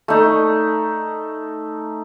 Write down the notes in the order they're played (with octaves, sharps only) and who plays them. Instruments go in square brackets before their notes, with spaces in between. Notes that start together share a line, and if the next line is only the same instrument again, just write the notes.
[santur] A3 D#4